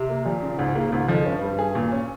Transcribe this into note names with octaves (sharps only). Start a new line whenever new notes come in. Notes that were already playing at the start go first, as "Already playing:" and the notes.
Already playing: C3
A#3
A#2 F3
C#3
C#2 G#2
C#3 A#3
C#2 G#2
F2 F3
G2 C#4
G3
G#4
A#2
C#4